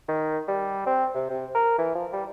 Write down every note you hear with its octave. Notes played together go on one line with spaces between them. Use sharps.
D#3
G3
C4
C3
C3
A#4
E3
F3
G3